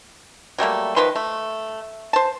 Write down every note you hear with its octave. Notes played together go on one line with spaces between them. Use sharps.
F#3 G3 A3 A#3
D#3 F3 B4 C6
A3
C5 A5